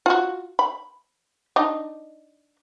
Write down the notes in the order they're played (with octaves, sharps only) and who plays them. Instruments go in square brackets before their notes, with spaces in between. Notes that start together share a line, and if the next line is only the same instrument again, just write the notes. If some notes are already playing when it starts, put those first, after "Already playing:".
[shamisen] F4 F#4
B5
D4 D#4 D#5